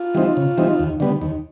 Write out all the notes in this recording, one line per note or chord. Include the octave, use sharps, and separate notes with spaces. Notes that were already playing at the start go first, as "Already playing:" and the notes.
Already playing: F4
E3 G3 C4 D#4
C#3
E3 G3 C4 D#4
D#2
D3 G3 B3
D#2